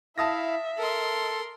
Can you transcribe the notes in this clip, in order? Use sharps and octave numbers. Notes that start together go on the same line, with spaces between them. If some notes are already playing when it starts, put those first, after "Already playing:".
E4 E5 F5 A5 D#6 A#6
A4 A#4 C6